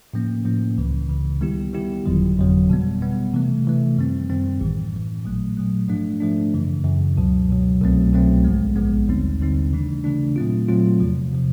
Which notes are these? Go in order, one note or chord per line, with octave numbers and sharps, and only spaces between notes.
A2 F3 A#3 C#4
A2 F3 A#3 C#4
C#2 C#3 E3
C#2 C#3 E3
D#3 G3 B3 E4 G4
D#3 G3 B3 E4 G4
G1 F2 D3 F#3
G1 F2 D3 F#3
B2 G3 B3
B2 G3 B3
C3 E3 A3
C3 E3 A3
F#2 D#3 G3 C4
F#2 D#3 G3 C4
A1 A2 E3
A1 A2 E3
A#2 F#3 A3
A#2 F#3 A3
G#2 F3 A3 D4
G#2 F3 A3 D4
F#2 C#3 E3
F#2 C#3 E3
C#2 B2 F#3
C#2 B2 F#3
C2 B2 F#3 A3 C4
C2 B2 F#3 A3 C4
A#1 G#2 F3 G#3 B3
A#1 G#2 F3 G#3 B3
D#2 D3 G3 C4 D#4
D#2 D3 G3 C4 D#4
C#3 E3 A3 D4
C#3 E3 A3 D4
A#2 F#3 A3 C4 F4
A#2 F#3 A3 C4 F4
E2 C3 F3
C3 F3